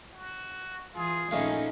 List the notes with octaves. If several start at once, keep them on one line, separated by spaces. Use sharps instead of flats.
F#4
E3 F4 G#4
A#1 A3 C#4 D#4 F5